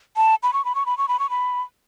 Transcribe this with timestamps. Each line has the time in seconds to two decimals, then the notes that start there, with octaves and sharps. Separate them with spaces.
0.17 A5
0.43 B5
0.53 C#6
0.65 B5
0.75 C#6
0.86 B5
0.98 C#6
1.08 B5
1.20 C#6
1.30 B5